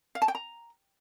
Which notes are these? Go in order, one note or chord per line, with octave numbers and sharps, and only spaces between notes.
F5
A5
G5
A#5